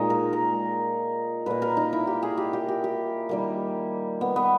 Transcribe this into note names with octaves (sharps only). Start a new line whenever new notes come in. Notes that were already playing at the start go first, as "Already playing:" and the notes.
Already playing: A#2 G#3 D#4
A#4
A#4
A#2 A#3 B4
A#4
D#4
E4
G4
G#4
G4
G4
G4
G4
D#3 G3 A#3
B3
B3